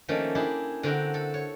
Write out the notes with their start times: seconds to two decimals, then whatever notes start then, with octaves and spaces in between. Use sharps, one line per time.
0.08 D#3 F3 A3 A#3 C#4 D4
0.35 D4 E4 G4 G#4
0.83 D3 C4 F#4 A#4 G5
1.14 A4
1.34 C#5